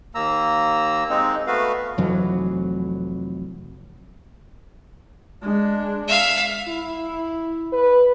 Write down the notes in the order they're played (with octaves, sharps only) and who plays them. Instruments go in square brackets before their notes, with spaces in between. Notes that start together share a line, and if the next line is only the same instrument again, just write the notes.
[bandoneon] D#2 A#3 A#5 E6
G#3 C4 D#4
A3 B3 F#4 B4 F5
[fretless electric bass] F1 F2 E3 F#3
[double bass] G#3 D4
[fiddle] E5 F5
[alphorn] E4
B4